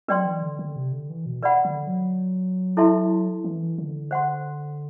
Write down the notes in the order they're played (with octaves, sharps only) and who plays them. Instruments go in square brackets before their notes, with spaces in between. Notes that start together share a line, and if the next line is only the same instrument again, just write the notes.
[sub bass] F#3 [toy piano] B4 D5 G5 C6
[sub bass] E3
D3
D3
C3
D3
E3
B2
[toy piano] B4 D5 F#5 B5
[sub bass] D3
F#3
[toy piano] E4 A4 E5 A5 C6
[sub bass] E3
D3
[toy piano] C5 F#5 C6